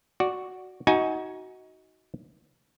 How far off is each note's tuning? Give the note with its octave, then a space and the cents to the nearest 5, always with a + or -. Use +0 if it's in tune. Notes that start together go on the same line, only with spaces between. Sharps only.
F#4 +0 D5 +0
D#4 +25 F#4 +10 G#5 +0